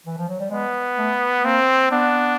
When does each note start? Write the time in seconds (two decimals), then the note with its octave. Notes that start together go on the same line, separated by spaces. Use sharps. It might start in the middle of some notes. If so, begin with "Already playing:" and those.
0.06 E3
0.17 F3
0.29 F#3
0.40 G3
0.50 G#3 B3
0.98 A3
1.44 A#3 C4
1.92 B3 D4